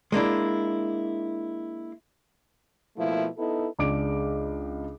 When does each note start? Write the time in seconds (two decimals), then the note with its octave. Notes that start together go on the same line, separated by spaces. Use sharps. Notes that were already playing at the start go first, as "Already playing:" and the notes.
0.12 G#3 A#3 D4 E4
2.97 B2 F3 A3 A#3 E4
3.38 B3 D#4 E4 A4
3.79 C#2 D4 G#4 D6 D7